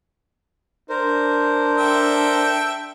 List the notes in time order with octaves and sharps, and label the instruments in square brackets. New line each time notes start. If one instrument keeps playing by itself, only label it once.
[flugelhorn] D4 [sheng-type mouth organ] A#4 C5
[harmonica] A4 E5 G5